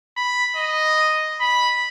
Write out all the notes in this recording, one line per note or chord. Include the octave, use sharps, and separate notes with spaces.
B5
D#5
B5